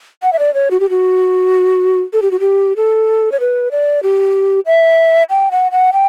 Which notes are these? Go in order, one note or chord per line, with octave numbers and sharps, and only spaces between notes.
F#5
E5
D5
C#5
F#4
G4
F#4
A4
G4
F#4
G4
A4
C#5
B4
D5
G4
E5
G5
F#5
F#5
G5